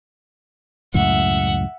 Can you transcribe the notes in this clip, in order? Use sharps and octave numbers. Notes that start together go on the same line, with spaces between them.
C#2 F#2 A2 E5 F#5